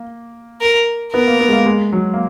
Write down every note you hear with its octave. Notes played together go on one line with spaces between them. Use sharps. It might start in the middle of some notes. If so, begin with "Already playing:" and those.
Already playing: A#3
A#4
B3 A#4
A#3
B3
G#3
A#3
G#3
F#3
A#3